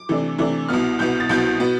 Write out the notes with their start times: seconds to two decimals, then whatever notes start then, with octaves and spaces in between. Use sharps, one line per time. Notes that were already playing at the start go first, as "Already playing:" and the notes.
Already playing: D6
0.09 C3 E3 A3 D4
0.38 C3 E3 A3 D4
0.69 C2 B2 B3 F6
0.99 C2 B2 B3 G6
1.20 A6
1.29 C2 B2 B3 G6
1.60 B2 B3